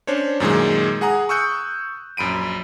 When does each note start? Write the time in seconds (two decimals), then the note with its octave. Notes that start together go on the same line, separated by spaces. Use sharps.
0.07 C#4 D4 C5 C#5
0.40 F#2 A#2 D#3 G#3
1.01 G#4 F#5 G#5 A#5 D#6
1.29 C#6 D#6 E6 F#6 G6 C#7
2.17 A#1 F#2 B5 D7 D#7